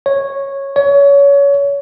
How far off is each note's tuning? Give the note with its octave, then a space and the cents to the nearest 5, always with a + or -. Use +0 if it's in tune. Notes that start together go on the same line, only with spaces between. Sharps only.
C#5 -10
C#5 +25